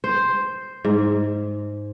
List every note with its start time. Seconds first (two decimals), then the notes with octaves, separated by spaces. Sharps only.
0.04 C5
0.85 G#2